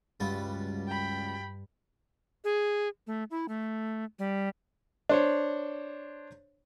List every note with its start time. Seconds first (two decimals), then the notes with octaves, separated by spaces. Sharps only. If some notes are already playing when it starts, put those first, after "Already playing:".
0.20 C#2 G2 G3 F4 F#4
0.88 G5 B5
2.44 G#4
3.07 A3
3.31 E4
3.48 A3
4.19 G3
5.09 D4 C5 C#5